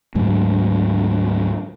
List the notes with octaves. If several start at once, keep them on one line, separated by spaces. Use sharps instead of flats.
D2 G#2 F#3